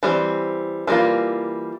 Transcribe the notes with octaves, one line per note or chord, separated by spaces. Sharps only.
E3 G3 C4
E3 G3 A#3 F4